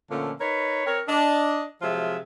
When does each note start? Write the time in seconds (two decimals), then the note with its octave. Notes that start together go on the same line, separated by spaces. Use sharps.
0.10 A#2 D3 F3 A3 A#3 C#4
0.41 D#4 A#4 B4 C#5
0.86 C4 A#4 C#5
1.08 D4 D#5
1.81 C3 F3 F#3 G#3 F4 E5